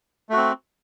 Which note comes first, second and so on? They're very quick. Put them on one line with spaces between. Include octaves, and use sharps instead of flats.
A3 F#4 C4